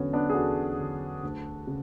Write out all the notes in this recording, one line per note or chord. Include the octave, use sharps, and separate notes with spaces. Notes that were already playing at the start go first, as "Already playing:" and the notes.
Already playing: E2 D3 F#3 B3 C#4 F#4
B3 D4
G#4
E2 F#4 A4
D3 F#3
D2
C#3